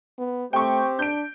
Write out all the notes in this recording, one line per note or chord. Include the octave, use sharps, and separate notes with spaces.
B3
A3 C4 G4 C5 G5 C#6
D4 G6 D7